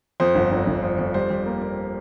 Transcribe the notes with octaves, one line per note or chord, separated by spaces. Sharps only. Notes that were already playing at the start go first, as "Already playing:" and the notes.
F2 C5
G1
G1
G1
F2
F2
G3 C5
G3
A#3
A#3